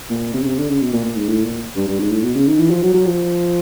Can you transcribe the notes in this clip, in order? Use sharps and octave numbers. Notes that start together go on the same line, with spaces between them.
A#2
C3
C#3
C3
D3
C#3
B2
A#2
A#2
G#2
A2
A#2
G2
G2
G#2
A2
B2
C#3
D#3
E3
F3
F#3
F#3
F3